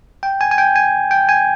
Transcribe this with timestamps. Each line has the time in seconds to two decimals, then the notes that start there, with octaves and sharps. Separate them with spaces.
0.23 G5
0.41 G#5
0.51 G#5
0.58 G5
0.76 G#5
1.11 G5
1.29 G#5